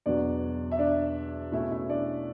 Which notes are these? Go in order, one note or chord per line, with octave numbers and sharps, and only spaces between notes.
E2 B2 F#3 D4 D5
E5
D4 D5
B2 A3 C#4 E4 E5
E4 E5
D4 D5